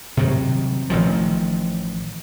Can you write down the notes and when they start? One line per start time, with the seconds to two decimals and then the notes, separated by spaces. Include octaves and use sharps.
0.17 C3 D#3 F#3 G3
0.90 A1 D#3 F3